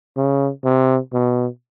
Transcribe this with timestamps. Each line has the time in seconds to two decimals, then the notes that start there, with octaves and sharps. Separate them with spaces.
0.16 C#3
0.64 C3
1.13 B2